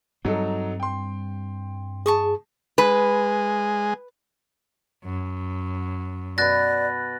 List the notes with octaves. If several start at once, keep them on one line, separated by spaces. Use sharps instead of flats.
G2 F#3 G3 C4 D#4 A4
G5 C6
G#4 A5 C#6 D#6
G#3 B4
F#2
B2 B4 D5 F#6 A6 A#6